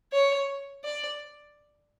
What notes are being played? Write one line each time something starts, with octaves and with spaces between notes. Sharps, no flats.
C#5
D5